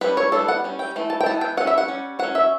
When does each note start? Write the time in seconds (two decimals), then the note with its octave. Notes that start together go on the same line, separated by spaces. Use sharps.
0.01 G3 C#4 B4
0.17 C#5
0.32 G3 B3 D4 A4
0.48 F#5
0.64 G3 C#4
0.79 G5
0.96 E3 A3
1.10 A5
1.21 G5
1.26 E3 B3 A5
1.41 G5
1.57 G3 C#4 F#5
1.67 E5
1.78 F#5
1.88 G3 C#4
2.19 F#3 C#4 F#5
2.35 E5